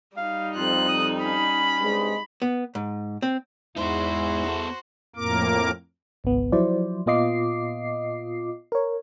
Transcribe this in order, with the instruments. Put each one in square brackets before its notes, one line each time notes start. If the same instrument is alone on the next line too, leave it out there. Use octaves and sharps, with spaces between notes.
[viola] G3 D#4 [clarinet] F5
[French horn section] F2 [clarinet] F4 [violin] F#6
[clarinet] D#6
[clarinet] C#4 [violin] B5
[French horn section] G2 C3 G#3
[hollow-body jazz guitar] B3
G#2
C4
[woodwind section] E2 [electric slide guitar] G#3 D#4 [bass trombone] E4 [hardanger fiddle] F#4 C5
[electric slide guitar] B3 A4
[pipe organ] F2 A2 A#3 A#4 D6
[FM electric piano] G#1 C#2 B3
F3 F#3 E4 C5 D5
A#2 B3 F4 D#5 D6 C7
A#4 C#5